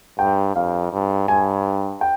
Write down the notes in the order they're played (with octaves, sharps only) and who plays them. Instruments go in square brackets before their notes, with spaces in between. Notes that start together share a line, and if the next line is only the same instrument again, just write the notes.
[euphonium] G2 [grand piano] G5
[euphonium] F2 [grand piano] F5
[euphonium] G2
[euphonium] G2 [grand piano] G#5
[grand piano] G5